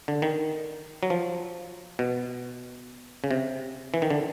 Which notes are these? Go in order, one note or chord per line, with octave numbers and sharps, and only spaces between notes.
D3
D#3
F#3
F3
B2
C#3
C3
E3
D#3
D3